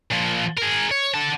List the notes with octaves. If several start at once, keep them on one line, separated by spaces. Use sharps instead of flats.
A#2 F3
G#4 A#4
C#5
D3 A5